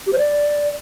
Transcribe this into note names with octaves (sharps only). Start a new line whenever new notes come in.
G4
C5
D5